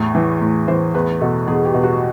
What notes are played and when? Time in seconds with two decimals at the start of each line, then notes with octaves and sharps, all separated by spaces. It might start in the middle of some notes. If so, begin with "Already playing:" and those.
Already playing: E2 A2
0.15 E3
0.41 A2
0.68 E3 C5
0.94 E2 B4
1.21 B2 A4
1.47 E2 G#4
1.65 G4
1.74 B2
1.83 F#4